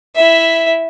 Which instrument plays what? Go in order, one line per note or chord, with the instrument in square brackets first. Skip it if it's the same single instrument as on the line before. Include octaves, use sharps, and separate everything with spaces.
[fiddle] E4 E5